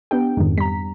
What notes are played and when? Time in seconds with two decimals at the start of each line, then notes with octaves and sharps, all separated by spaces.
0.11 B3 D4 G4 G5
0.37 F2 G#2 D#3
0.58 G3 A#5 B6